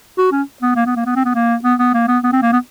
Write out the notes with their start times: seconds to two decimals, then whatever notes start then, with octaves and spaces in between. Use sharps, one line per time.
0.18 F#4
0.32 C#4
0.62 B3
0.76 A#3
0.86 B3
0.96 A#3
1.06 B3
1.16 C4
1.25 B3
1.35 A#3
1.64 B3
1.79 B3
1.94 A#3
2.08 B3
2.23 B3
2.33 C4
2.42 A#3
2.52 B3